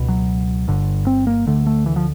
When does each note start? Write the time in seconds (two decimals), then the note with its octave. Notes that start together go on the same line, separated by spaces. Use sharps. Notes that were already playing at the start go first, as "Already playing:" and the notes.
Already playing: C#2 B2
0.09 F#3
0.68 G1 G2 D3
1.07 C4
1.27 A#3
1.47 D2 D3 A3
1.67 A3
1.86 E3
1.96 F3